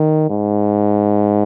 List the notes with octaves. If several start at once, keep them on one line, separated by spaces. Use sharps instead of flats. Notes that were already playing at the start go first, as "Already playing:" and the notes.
Already playing: D#3
G#2